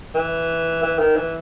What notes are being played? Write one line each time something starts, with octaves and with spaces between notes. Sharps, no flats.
E3
E3
D#3
E3